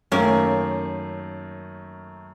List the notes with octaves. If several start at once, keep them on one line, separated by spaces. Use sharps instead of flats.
F#2 D#3 A3 A#3 C#4